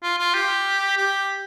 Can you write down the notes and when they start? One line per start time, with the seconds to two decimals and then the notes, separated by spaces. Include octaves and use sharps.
0.03 F4
0.18 F4
0.34 G4
0.97 G4